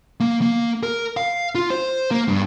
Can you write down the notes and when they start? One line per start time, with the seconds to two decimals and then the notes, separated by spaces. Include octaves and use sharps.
0.20 A#3
0.42 A#3
0.83 A#4
1.17 F5
1.55 F4
1.70 C5
2.11 A#3
2.28 G2